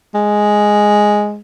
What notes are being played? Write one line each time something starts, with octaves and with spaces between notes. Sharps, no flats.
G#3